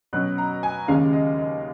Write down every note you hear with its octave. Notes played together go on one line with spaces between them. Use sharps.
B2 F#3 C#4 F#6
A#5
G#5
D#2 C#3 G#3 C#4 F5
D#5
D#5